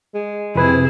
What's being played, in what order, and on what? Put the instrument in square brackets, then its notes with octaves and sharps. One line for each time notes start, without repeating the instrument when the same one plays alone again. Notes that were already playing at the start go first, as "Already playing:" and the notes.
[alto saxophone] G#3
[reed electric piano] F2 B4 [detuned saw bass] C3 [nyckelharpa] E4 G#4